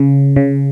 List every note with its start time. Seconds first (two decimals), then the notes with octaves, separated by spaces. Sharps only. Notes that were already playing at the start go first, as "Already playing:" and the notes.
Already playing: C#3
0.36 C#3